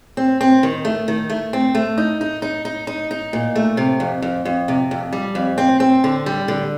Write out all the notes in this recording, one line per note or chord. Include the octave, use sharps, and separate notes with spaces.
C4
C4
D#3
A3
D#3
A3
C4
A3
D#4
D#4
D#4
D#4
D#4
D#4
A#2
A3
C3
F2
F2
F2
C3
F2
G3
F2
C4
C4
D3
G3
D3